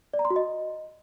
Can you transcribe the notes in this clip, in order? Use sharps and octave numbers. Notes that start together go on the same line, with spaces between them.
D5
A#5
C6
F#4
D#5